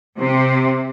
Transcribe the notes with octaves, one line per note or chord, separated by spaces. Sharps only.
C3